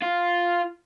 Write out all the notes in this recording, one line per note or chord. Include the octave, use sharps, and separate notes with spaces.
F4